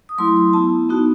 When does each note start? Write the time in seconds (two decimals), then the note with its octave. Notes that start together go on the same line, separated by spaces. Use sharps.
0.09 D#6
0.18 F#3 A3 E4 C6
0.53 B3 E4 A5
0.89 B3 D#4 F#4